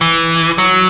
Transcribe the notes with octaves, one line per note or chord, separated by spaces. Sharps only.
E3
F#3